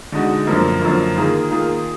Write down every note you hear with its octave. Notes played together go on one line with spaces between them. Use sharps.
D3 G#3 D#4 F#4
F#2 D3 F3 A#3
F#2 D3 F3 A#3
D#3 A#3 F4 G#4
D#3 A#3 F4 G#4